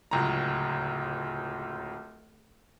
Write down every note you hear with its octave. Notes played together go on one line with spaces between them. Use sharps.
D1 C#2 A#5